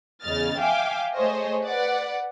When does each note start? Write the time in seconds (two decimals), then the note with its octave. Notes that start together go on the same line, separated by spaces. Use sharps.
0.24 E2 C#3 D#5 F6 A6
0.60 E5 F5 G5 G#5 D6
1.15 A3 G#4 C5 C#5 D#5
1.64 B4 D5 F#5